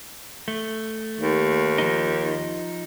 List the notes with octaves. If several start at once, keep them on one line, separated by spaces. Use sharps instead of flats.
A3
D#2
F3 D#4